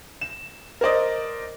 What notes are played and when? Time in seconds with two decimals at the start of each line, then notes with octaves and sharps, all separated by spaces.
0.21 E7
0.81 A#4 C5 D5 D#5